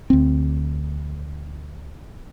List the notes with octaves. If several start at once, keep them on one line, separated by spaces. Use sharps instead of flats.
D2 C4